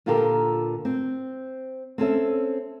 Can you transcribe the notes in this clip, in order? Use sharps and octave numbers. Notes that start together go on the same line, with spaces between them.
A#2 D3 F4 G4 A4 A#4
C4
C4 C#4 A4 E5